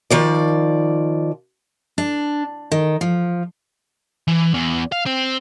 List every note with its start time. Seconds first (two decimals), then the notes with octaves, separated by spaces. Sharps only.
0.10 D#3 F3 D5
1.98 D4
2.72 D#3
3.01 F3
4.28 E3
4.54 E2
4.92 F5
5.06 C4